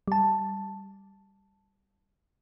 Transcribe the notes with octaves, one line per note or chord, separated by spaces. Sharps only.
G3 A5